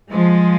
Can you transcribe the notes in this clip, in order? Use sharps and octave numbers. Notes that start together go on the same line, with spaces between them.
F3 G#3